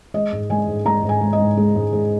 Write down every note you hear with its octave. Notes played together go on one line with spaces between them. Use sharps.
G#3 D#5
G#2
G#3 G#5
G#2
G#3 A#5
G#2
G#5
G#3
D#5
G#2
G#3
G#2
G#3